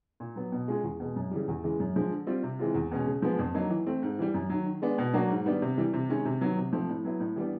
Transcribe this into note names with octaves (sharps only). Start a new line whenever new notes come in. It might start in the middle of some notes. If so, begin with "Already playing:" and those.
A#2
F#3 B3
B2
G#3 C#4 F4 G#4
E2
B2 G#3
F#2
C#3 E3 G3
E2
C#3 E3 G#3
F#2
D3 F3 G#3
D3
G3 C4 F4
C3
E3 G#3 C4 F4
E2
B2 G#3 C#4
C#3
F3 G#3 B3
F2
D3 F#3 A#3 D#4
E3
A3 C4
G#2
E3 G3
F#2
D#3 F#3
D#3
G#3 B3 D4
B2
F#3 A#3 D4 F#4
G#2
D#3 G3 B3 D4
C3
E3 G3
C3
D#3 G#3 C#4
C3
D#3 F#3 B3
C3
F3 A3 C4
A2
F#3 B3 E4
A2
E3 G3 B3 D4